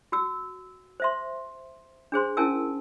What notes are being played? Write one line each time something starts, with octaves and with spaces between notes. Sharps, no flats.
F#4 E6
C5 E5 C6
D4 G#4 C5 C6
C#4 E4 A#4 G#5 A5 E6